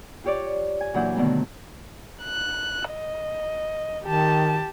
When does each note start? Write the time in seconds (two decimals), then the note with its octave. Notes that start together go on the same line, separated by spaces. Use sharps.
0.24 F4 G4 C#5 D5
0.81 G#5
0.94 A#2 E3 F#3 D4 F#5 G6
1.16 B2 D3 D#3 A3 B3
2.23 F#6
2.90 D#5
4.04 D#3 G4 A5